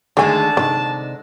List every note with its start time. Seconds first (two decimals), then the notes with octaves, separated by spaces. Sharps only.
0.17 D3 D#3 G#3 A3 G#4 G#5 A5
0.57 C3 D#3 D5